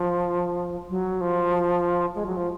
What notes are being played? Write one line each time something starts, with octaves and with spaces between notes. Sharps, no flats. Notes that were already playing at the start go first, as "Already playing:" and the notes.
Already playing: F3
F#3
F3
G#3
F#3
F3